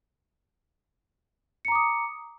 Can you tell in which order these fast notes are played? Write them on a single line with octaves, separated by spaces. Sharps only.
C#7 A#5 D6 D#6